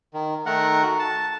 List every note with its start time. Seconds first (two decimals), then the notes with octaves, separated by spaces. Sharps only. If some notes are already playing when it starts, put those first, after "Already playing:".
0.14 D#3
0.46 D#3 A3 A#4 F#5
0.83 F#4
0.99 A5